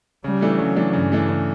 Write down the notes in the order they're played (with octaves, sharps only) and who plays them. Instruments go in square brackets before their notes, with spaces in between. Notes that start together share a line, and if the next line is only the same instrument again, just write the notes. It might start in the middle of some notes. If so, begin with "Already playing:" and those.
[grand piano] C#3 [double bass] G3
[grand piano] E3 A3 D4
[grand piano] C#3 [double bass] F#3
[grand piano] E3 A3 D4
[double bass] G2 [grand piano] C#3
[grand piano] E3 A3 D4
C#3